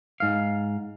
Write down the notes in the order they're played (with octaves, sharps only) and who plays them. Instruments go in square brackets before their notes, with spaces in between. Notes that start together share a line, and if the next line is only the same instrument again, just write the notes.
[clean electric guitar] G#2 F5